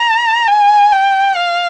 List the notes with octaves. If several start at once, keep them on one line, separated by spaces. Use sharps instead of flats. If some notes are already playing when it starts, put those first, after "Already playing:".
Already playing: A#5
G#5
G5
F5